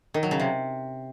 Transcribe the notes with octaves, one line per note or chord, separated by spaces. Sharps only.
D#3
F#3
C#3
C3